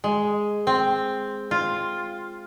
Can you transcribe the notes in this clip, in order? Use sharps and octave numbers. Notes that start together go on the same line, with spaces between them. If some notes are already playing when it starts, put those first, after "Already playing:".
G#3
C4
F4